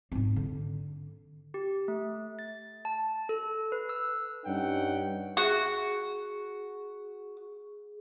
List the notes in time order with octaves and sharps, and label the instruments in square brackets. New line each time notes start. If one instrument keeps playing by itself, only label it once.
[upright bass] G#2 C4
D3
[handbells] G4
A3
A6
A5
A4
B4
E6
[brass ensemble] G2 C#4 D#4 F#5 G5
[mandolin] F#4 [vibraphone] G#4